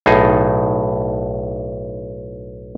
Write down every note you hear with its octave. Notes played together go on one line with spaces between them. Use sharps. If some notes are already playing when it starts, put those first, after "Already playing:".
B1 A2 D#4 G#4